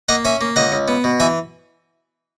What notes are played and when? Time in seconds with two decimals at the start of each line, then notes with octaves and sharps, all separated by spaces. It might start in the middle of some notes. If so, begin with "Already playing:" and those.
0.09 A#3 D#5 F#5
0.25 C#4 E5 G#5
0.41 A#3
0.56 C#2 D#5 F#5
0.72 C#2
0.88 B3
1.04 B2
1.20 E3 E5 G#5